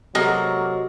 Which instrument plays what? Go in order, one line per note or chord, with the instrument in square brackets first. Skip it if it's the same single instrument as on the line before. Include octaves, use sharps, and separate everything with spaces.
[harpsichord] C3 G#3 A4 [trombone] F#3 [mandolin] A#3 [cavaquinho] D#5